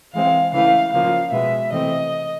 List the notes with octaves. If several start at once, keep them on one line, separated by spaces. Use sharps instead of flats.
E3 G#3 C4 F5
C#3 E3 A3 F5
C#3 F3 A#3 F5
B2 G#3 B3 E5
C3 E3 A3 C4 D#5